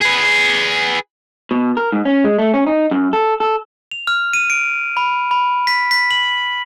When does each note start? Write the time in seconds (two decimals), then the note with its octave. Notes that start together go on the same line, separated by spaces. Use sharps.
0.02 G#4 B4
1.51 B2
1.77 A#4
1.92 G#2
2.05 C#4
2.24 G#3
2.38 A3
2.54 C#4
2.67 D#4
2.91 F#2
3.13 A4
3.40 A4
3.91 F7
4.07 F6
4.33 D#7
4.50 D7
4.97 B5
5.31 B5
5.67 B6
5.91 B6
6.11 F#7